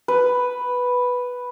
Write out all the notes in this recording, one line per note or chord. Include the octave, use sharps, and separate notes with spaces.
B4